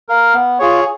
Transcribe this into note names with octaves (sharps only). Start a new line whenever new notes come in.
A#4 F5
B3
F4 G#4 C#5